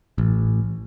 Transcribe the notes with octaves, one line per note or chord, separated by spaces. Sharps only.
A1